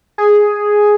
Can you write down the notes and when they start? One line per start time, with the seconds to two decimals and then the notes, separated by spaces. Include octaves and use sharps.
0.18 G#4